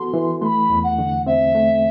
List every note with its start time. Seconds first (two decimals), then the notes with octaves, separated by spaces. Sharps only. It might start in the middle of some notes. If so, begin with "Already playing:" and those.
Already playing: E3 B3 F#4 A4 C6
0.13 E3
0.41 A3 B5 C6
0.70 E2
0.84 F#5
0.98 D3
1.26 C4 E5
1.55 A3